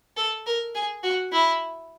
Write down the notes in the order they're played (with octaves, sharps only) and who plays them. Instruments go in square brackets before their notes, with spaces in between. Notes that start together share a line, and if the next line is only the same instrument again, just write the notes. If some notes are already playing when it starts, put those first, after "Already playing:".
[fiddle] A4
A#4
G#4
F#4
E4